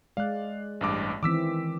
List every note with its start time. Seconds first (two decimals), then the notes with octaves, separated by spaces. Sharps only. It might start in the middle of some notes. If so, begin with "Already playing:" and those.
0.17 G#3 D5 F5 F#6
0.81 A1 G2 D6
1.23 D#3 E3 C4 D6 E6 B6